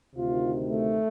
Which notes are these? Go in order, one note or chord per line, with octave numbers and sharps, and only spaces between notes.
D2 C3 D#3 F4
A3